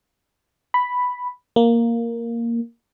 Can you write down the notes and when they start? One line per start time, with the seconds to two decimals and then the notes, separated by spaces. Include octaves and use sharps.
0.74 B5
1.56 A#3